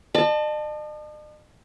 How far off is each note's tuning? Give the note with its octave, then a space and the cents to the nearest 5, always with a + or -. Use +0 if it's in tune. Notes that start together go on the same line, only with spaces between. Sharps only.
D#5 -45 A5 +0